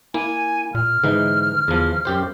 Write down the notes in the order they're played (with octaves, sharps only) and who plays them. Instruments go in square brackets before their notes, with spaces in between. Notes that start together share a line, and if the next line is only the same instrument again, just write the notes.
[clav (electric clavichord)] A#3 [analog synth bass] E4 [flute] G#5
[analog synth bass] A#2 [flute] F6
[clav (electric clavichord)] G#2 E3 D#4 [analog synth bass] D3
[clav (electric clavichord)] E2 F3
F#2 G4 C5